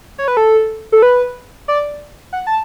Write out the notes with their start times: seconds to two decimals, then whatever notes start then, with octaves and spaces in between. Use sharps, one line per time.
0.18 C#5
0.28 B4
0.37 A4
0.92 A4
1.02 B4
1.68 D5
2.33 F#5
2.47 A5